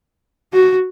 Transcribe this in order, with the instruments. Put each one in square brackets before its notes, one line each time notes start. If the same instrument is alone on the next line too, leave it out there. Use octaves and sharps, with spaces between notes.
[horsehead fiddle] F#4